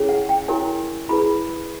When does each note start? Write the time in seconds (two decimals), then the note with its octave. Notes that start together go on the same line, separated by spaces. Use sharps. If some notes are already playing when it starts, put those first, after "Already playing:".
Already playing: C#4 E4 G#4 C#5
0.09 F#5
0.29 G5
0.48 E4 G4 A#4 C#5 G#5
1.09 E4 G#4 B4 B5